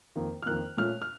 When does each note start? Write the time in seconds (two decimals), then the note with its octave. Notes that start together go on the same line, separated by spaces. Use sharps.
0.16 F2 D#3 A#3
0.42 F6
0.46 F2 D#3 A#3 F#6
0.77 A#2 A3 C#4 F6
1.02 F6